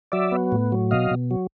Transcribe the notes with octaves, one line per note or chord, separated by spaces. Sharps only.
F#3 D5 E5
B3
A2
F#3
B2 D#5 F5
B2
F#3